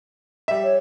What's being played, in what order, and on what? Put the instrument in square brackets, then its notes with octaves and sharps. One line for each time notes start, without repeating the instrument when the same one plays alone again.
[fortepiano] G3 E5
[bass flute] C#5